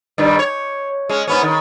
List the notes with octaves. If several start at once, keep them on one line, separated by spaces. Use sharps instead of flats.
G2 D#3 G3
C#5
G#3 C#4
G#2 B3 C#4
D#3